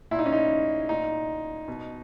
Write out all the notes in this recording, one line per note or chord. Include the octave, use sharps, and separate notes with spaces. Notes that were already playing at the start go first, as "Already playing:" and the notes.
A#2 E4
D#4
C#4
D#4
A#2 D#4
B2